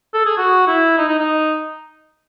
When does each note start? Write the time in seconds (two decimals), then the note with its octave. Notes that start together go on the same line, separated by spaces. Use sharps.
0.14 A4
0.26 G#4
0.38 F#4
0.68 E4
0.98 D#4
1.08 D#4
1.18 D#4